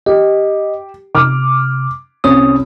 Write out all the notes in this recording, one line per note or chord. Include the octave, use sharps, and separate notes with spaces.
G4 D#5
C3 D6 F6
C2 C#4 C#5 D#6